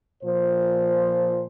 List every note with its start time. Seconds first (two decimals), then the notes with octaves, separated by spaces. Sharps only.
0.24 A#2 F3 C5